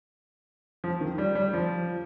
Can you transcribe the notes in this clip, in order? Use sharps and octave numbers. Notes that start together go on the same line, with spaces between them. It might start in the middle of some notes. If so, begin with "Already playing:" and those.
F3
D#3
G3
G3
F3